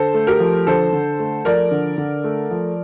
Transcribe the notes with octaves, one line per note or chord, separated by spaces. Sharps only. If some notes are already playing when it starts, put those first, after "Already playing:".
Already playing: D3 A4 C5
A3
G4 A#4
F3
D3 A4 C5
D3
A3
F3 A#4 D5
D3
D3
A3
F3